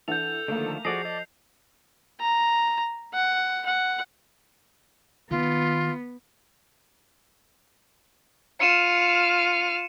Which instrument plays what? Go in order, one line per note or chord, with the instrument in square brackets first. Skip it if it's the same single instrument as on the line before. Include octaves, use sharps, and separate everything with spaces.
[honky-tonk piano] E3 D4 F#5 [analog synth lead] A4 [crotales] G6 F7
[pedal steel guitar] D3 D#3 F3 [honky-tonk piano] A3 A#3
[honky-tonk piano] F3 A4 [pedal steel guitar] F#4 D5 D#5 [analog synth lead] G#4 [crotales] C7
[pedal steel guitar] D5 [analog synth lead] D#5
[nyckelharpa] A#5
F#5
F#5
[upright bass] D#3 [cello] B3 [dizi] F4
[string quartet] F4 F6 [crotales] C#7 D#7 E7